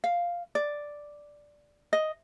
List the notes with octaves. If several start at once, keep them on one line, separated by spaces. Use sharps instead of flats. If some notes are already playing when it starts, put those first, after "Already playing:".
F5
D5
D#5